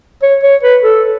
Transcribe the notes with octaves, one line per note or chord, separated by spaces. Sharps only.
C#5
C#5
B4
A4